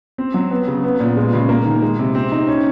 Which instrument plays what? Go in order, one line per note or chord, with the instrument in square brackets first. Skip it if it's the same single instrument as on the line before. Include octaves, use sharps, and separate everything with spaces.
[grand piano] C4
F#3
B3
C#3
B3
A#2
G#3
C#3
A#3
D#3
G#3
C3
C4
D#4
C#4